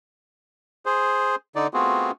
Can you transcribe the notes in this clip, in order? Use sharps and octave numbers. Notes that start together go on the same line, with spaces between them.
G#4 C5
D3 D#4 D5
A3 B3 C4 F4 F#4 G#4